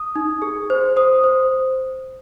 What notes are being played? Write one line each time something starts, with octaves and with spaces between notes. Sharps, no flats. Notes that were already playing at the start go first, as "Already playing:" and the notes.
Already playing: D#6
D#4
G#4
C5
C5 D#6
C5